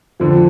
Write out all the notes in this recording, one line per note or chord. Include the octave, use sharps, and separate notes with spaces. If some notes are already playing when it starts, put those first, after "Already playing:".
F2 D3 F3